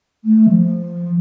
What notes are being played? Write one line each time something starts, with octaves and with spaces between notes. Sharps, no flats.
A3
F3